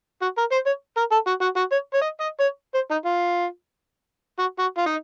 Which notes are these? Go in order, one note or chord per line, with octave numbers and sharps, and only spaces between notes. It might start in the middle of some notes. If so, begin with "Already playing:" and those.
F#4
A#4
C5
C#5
A#4
A4
F#4
F#4
F#4
C#5
C#5
D#5
D#5
C#5
C5
D#4
F4
F#4
F#4
F4
D#4